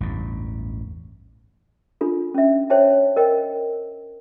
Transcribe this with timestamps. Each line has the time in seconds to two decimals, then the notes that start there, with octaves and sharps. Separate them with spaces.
0.01 A1 E2 G2
2.01 D4 F4 A4
2.35 C#4 E5
2.70 C5 C#5 E5 G5 A5
3.16 A#4 C5 D#5 G5